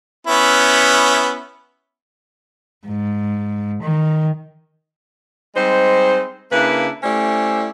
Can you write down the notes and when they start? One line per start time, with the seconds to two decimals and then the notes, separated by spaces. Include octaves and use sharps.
0.27 B3 C#4 E4
2.87 G#2
3.82 D#3
5.56 G3 G#3 C4 D#4 C5
6.52 C#3 A#3 D4 E4 B4
7.03 A3 C#4 E4 G4 C5 D5